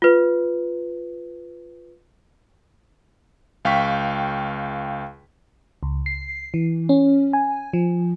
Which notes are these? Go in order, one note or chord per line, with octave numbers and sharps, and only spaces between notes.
F4 B4
C#2 F5 G5 C#6 B6
C#2
C7
E3
C#4
G#5
F3